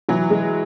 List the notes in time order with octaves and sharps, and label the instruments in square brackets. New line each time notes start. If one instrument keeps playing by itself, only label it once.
[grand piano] E3 [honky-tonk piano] F#3
[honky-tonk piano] G#3